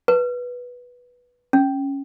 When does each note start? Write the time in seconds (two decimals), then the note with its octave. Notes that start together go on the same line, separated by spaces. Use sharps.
0.08 B4
1.53 C#4